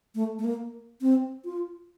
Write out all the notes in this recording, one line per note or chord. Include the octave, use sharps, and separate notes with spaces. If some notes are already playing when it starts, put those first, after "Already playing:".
A3
A3
A#3
C4
F4